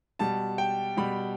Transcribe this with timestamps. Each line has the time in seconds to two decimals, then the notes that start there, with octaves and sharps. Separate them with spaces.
0.19 B2 G3 A5
0.58 G5
0.97 B2 G3 B5